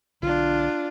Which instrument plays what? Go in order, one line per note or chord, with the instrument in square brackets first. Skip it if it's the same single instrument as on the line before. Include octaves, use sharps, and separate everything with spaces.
[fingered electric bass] B1 D3 [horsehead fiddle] D4 F4